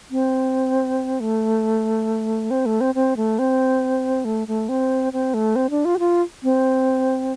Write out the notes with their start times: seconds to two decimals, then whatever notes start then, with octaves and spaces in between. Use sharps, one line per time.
0.11 C4
1.20 A3
2.51 C4
2.66 A3
2.81 C4
2.95 C4
3.17 A3
3.39 C4
4.25 A3
4.48 A3
4.69 C4
5.13 C4
5.34 A3
5.56 C4
5.70 D4
5.85 F4
5.95 G4
5.99 F4
6.43 C4